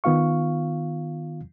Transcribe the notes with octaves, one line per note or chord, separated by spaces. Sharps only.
D#3 B3 F4 F5 C#6